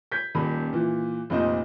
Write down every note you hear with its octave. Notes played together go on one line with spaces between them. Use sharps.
G6 G#6 B6
D#1 A#2 D#3 B5
A#2 E3
F1 F2 A#2 D#4 C5 D#5